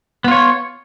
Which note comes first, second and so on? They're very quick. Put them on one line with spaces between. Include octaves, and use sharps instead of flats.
B3 F4 C#5